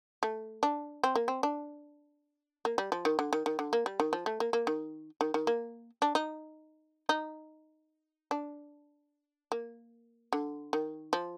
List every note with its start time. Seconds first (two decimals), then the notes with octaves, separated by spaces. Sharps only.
0.23 A3
0.63 D4
1.04 C4
1.15 A#3
1.28 C4
1.43 D4
2.65 A#3
2.78 G3
2.92 F3
3.05 D#3
3.19 D3
3.33 D#3
3.46 D#3
3.59 D3
3.73 A#3
3.86 G3
4.00 D#3
4.13 F3
4.26 A3
4.40 A#3
4.53 A#3
4.67 D#3
5.21 D#3
5.34 D#3
5.47 A#3
6.02 D4
6.15 D#4
7.09 D#4
8.31 D4
9.52 A#3
10.33 D3
10.73 D#3
11.13 F3